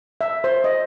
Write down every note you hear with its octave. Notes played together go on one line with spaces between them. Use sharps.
E5
C5
D#5